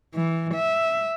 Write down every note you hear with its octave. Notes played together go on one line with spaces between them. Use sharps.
E3
E5